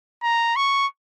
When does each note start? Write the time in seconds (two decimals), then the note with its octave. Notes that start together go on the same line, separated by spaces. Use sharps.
0.23 A#5
0.56 C#6